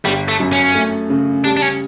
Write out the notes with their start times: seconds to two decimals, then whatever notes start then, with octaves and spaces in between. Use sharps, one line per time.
0.04 G1 G3
0.28 A3
0.40 F#2
0.52 C#4
0.75 A3
1.10 C#3
1.44 G3 D4
1.57 D4
1.62 C#4